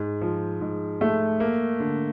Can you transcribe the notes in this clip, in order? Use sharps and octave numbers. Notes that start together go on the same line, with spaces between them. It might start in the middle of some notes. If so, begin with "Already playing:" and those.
Already playing: G#2
F3
G#2
A3
A#3
D3